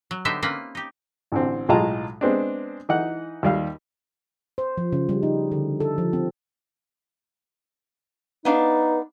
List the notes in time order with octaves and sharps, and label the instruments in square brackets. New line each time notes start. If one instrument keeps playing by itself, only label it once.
[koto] F#3
D3 B3 D#4 G4 C5 E5
A#3 C4 C#4 B4
D#4 G4
[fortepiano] A1 D3 C4
B1 A2 G#3 F4 A5 A#5
G#3 B3 C4 D4
E3 D#4 F#5 F#6
D#2 G3 F5
[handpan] C5
F3
C#3
G3
D#4
D3
A4
F3
C4
[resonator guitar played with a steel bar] B3 D4 F5 [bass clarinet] D#4 [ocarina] B4